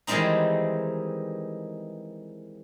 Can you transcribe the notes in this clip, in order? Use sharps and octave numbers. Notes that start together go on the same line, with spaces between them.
D#3 E3 G3 G#3 C4 D#4